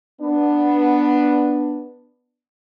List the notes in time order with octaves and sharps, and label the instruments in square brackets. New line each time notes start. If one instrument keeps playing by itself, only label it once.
[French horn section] B3 D4